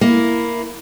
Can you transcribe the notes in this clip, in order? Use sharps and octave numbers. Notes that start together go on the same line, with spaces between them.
A#3 E4